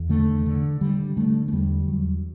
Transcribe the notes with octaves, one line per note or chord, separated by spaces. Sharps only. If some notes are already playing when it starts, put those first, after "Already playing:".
Already playing: E2
D3 A3
D3
D3 G3
D3 A3
A3
E2 G3
E2 F#3